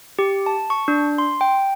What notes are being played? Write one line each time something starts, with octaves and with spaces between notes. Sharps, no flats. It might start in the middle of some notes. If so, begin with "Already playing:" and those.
G4
A5
C#6
D4
C6
G5